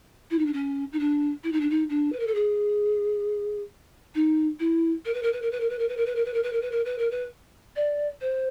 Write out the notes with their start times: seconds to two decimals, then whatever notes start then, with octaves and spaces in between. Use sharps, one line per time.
0.30 E4
0.38 D#4
0.46 D4
0.53 C#4
0.92 D#4
0.99 D4
1.43 E4
1.52 D#4
1.60 D4
1.70 D#4
1.89 D4
2.12 B4
2.19 A#4
2.27 A4
2.34 G#4
4.15 D#4
4.59 E4
5.05 A#4
5.14 B4
5.23 A#4
5.33 B4
5.42 A#4
5.51 B4
5.60 A#4
5.69 B4
5.79 A#4
5.88 B4
5.97 A#4
6.06 B4
6.15 A#4
6.25 B4
6.33 A#4
6.43 B4
6.53 A#4
6.61 B4
6.71 A#4
6.85 B4
6.98 A#4
7.11 B4
7.76 D5
8.21 C5